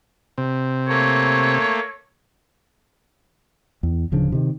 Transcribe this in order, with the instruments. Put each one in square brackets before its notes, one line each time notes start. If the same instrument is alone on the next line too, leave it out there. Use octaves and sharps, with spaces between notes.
[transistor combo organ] C3
[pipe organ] A3 A#3 [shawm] C#5
[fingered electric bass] E2
D1 C#3 F3 D4
C3 D#3